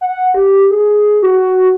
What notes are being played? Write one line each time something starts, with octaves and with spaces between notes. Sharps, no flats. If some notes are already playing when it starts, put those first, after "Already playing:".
F#5
G4
G#4
F#4